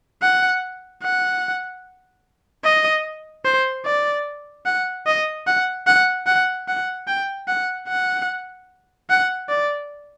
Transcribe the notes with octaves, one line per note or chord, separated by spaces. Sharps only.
F#5
F#5
D#5
C5
D5
F#5
D#5
F#5
F#5
F#5
F#5
G5
F#5
F#5
F#5
D5